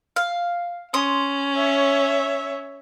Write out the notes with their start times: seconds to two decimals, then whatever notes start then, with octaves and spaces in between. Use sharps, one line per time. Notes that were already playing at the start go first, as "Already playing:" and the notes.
0.16 F5
0.94 C#4 C6 D#6
1.55 C#5 E5